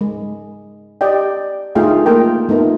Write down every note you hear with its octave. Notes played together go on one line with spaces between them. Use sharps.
G#3
G4 D5 D#5 G5
A3 D#4 F4 G#4 F5 G5
A#3 F4 A#4 G5
A3 B3 D#4 F4 A#4